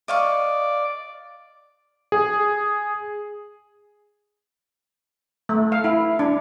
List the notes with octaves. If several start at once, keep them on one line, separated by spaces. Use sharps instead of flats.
D5 D#5 F5 C#6
G#4
A3
F5
E4
D4